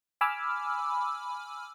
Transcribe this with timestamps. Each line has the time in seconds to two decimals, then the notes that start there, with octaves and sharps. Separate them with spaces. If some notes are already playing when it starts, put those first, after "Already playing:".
0.21 G#5 B5 D6 E6 F6